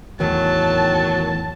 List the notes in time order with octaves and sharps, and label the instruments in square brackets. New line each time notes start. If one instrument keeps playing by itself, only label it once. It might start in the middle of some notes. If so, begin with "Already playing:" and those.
[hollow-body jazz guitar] E2 A2 [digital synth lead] D#3 [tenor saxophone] F#3 [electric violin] A5